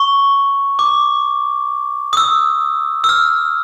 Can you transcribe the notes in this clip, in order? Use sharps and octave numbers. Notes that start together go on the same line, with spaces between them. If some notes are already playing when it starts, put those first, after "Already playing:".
Already playing: C#6
D6
D#6
E6
E6
F6